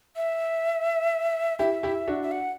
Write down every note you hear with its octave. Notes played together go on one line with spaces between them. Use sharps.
E5
E4 G4 E5
E4 G4
D4 F#4
E5
F#5